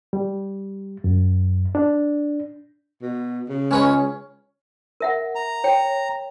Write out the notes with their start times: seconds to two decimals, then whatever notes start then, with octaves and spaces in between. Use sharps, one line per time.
0.13 G3
1.04 F#2
1.75 D4
3.02 B2
3.49 C#3
3.71 G#3 C#4 B4 C#5
5.00 A#4 E5 F#5
5.35 A#5
5.64 C#5 G5